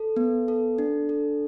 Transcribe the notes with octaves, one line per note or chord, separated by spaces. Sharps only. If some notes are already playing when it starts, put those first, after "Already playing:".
Already playing: A4
B3
A4
D4
A4